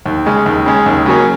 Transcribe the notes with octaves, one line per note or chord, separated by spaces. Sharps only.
D#2
C#3 G#3 C#4
D#2
C#3 G#3 C#4
D#2
C#3 F#3 A#3 C#4